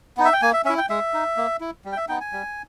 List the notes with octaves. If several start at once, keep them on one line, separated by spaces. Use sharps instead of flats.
B3 D#4
E5
G5
A#3 G#5
E5
C#4 E4 E5
G5
G#3 E5
D#4
A#3
E4
G3
G5
E5
B3 D#4 G5
G#5
G3